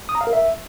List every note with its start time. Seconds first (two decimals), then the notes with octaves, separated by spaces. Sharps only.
0.09 D#6
0.15 A#5
0.21 F5
0.27 A#4
0.33 E5